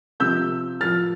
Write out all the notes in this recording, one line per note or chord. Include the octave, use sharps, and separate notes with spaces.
C3 F3 E6 G6
A2 F3 F6 A6